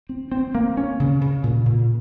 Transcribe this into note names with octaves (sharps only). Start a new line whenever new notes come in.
C4
C4
A#3
C#4
C#3
C#3
A#2
A#2